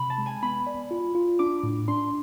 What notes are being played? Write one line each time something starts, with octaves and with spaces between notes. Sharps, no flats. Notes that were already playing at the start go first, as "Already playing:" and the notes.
Already playing: C3 B5
A5
G#3
G#5
B3 B5
D5
F4
F4
D4 D6
A2
D4 C6